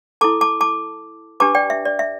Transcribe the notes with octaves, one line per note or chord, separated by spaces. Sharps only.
E4 A4 A5 D6
A5 D6
A5 D6
D4 G4 B4 A5 D6
D5 G5
E5
D5
E5